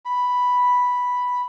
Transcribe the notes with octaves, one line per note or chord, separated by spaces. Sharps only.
B5